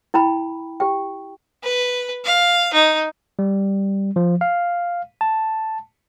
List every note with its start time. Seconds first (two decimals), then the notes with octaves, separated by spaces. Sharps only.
0.14 E4 G5 A#5 B5
0.80 G4 G5
1.63 B4
2.25 F5
2.73 D#4
3.39 G3
4.16 F3
4.41 F5
5.21 A5